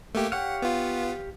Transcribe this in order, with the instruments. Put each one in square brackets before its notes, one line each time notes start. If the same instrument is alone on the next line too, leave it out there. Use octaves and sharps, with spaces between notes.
[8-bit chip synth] A3 A#3 G4
[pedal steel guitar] G4 C#5 F5 [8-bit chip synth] F#5
[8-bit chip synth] B3 F4